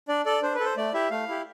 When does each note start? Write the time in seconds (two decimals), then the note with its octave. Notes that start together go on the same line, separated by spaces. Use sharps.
0.08 D4 D5
0.26 A4 D5
0.42 D4 C5
0.55 B4
0.60 A4
0.65 C5
0.77 A3 D5
0.94 E4 G4 E5
1.11 A3 F5
1.29 E4 G4